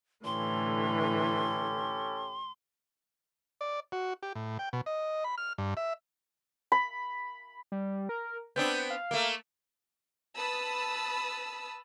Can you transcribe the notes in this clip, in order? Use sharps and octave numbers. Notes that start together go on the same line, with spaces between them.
A2 D3 E3 C#4 G4 A4 C6
D5
F#4
G4
A2
G5
B2
D#5
B5
F6
G2
E5
B5
G3
A#4
B3 C4 D4 G6
F5
A3 A#3
B4 A5 B5 D#6 E6